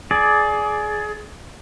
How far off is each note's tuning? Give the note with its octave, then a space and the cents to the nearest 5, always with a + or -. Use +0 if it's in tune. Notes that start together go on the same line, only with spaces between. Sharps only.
G#4 +25 D5 +0